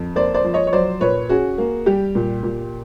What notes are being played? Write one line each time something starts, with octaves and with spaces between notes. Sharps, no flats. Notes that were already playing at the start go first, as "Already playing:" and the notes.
Already playing: F2
A#3 C5 D5
C5 D5
F3
C#5 D#5
C#5
F#3 C5 D5
A#2 B4 C#5
C#4 F#4 G#4
A#3
G3 G4
A#2
A#2